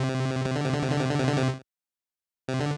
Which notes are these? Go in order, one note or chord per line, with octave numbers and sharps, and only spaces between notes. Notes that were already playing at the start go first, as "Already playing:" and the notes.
Already playing: C3
C3
D3
C3
D3
C3
D3
C3
D3
C3
D3
C3
C3
D3